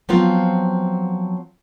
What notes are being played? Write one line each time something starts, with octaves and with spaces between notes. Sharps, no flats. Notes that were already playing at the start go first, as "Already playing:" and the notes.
F3 F#3 B3 C4 F4